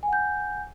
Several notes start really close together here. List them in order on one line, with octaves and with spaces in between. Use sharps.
G#5 F#5 G6